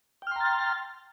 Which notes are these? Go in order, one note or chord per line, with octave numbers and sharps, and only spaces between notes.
G5 A#5 C6 F6 A6